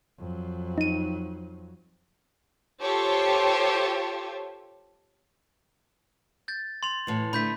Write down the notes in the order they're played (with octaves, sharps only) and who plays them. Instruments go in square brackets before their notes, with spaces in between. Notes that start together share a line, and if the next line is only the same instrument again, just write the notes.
[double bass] F2 F#3
[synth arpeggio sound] D#4 D#7
[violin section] F4 G4 A4 C5 C#5
[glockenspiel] G6 A6
C6 A6 F7
[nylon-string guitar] A2 E3
[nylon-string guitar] D3 A3 [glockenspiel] B5 G6 B6